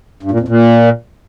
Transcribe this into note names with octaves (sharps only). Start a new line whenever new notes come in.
G2
A#2
F2
A#2